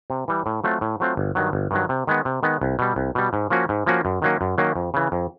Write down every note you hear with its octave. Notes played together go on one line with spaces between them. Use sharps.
C3
E3 G3
A2
F#3 A3 C4 F4
A2
F#3 A3 C4 F4
G1
G2 D#3 F#3
G1
G2 D#3 F#3
C3
D#3 G#3 B3
C3
D#3 G#3 B3
C2
B2 G3
C2
B2 G3
G#2
F3 A#3 C#4 F#4
G#2
F3 A#3 C#4 F#4
F#2
D#3 F#3 A#3 C#4
F#2
D#3 F#3 A#3 C#4
F2
C#3 E3
F2